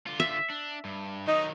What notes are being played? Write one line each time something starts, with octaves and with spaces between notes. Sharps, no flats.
D3 F4
E5
D4
G2
D#3 F#3 D#4